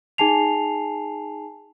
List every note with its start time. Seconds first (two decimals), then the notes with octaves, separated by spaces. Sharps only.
0.18 D#4 G#4 G#5 A5 C7 F7